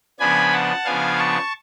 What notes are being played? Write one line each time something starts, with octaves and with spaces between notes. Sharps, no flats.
C#3 F3 B3 D4 G#5 B5
F#5 A5
C#3 F3 B3 D4 F5 G#5
A5 C#6